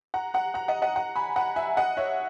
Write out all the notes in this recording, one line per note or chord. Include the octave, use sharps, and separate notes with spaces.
F#5 A#5
F#5 A#5
F#5 A#5
D#5 F#5
D#5 F#5
F#5 A#5
G#5 B5
F#5 A#5
E5 G#5
D#5 F#5
C#5 E5